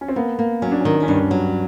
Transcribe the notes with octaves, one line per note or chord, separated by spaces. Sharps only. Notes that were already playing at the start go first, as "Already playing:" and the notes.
C#4
C4
A#3 B3
A#3
F#3 C#4
D4
D#3 C#4
C#4
G2 D4
F#3